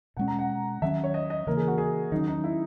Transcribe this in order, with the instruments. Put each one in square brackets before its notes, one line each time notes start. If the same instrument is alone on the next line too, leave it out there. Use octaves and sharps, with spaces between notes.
[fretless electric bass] B2 G#3 C#4 [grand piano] F#5
[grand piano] A#5
F#5
[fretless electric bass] D#3 F#3 A#3 C#4 [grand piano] E5
[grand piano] C#5
D#5
D#5
[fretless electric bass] C#3 E3 A#3 [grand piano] A#4
[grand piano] G#4
F#4
G#4
[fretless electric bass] D#3 F#3 C#4 [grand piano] D#4
[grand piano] D#4
E4